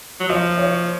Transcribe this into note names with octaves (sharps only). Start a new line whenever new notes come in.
F#3
F3 D#5
C#5